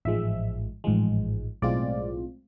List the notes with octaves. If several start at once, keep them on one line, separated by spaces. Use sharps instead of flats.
A1 G#2 F3 G#3 E5
A1 G#2 F3 G#3
B1 A2 G#3 C4 F4 D5